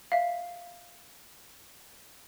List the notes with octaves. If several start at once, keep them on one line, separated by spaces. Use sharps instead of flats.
E5 F5